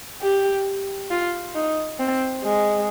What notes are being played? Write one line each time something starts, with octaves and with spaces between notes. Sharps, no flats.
G4
F4
D#4
C4
G#3